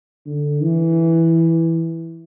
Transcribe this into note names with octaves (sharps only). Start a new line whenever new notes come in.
D3
E3